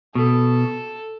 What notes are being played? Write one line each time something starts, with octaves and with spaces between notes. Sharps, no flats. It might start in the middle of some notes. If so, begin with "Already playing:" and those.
B2 A4